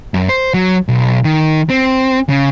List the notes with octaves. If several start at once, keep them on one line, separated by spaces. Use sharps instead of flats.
F#2
C5
F#3
B1
D#3
C4
C#3